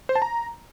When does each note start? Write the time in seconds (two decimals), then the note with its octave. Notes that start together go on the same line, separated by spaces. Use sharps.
0.09 C5
0.15 A5
0.22 A#5